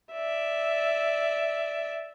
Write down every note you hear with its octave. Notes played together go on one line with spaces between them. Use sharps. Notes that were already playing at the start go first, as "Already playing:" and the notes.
D5 E5